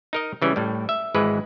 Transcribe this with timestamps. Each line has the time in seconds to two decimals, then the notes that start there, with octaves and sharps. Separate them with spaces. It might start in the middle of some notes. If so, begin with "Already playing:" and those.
0.13 D#4 A#4 D#5
0.42 C#3 E3 G3 C#4
0.56 A2 G3
0.89 E5
1.15 G#1 E3 G#3 B4